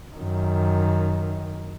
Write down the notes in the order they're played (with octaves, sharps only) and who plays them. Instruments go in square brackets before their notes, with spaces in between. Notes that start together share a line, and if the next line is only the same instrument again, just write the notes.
[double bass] F#2 D#3